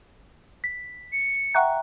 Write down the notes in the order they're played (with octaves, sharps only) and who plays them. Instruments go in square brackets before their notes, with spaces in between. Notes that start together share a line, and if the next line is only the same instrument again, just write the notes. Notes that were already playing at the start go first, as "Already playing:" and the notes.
[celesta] B6
[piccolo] C#7
[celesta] E5 G5 A#5 [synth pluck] F#5 C#6 F#6